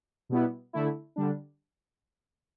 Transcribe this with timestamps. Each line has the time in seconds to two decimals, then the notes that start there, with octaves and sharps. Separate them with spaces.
0.29 B2 G3 B3 E4
0.73 D3 A3 E4
1.16 D3 G3 D4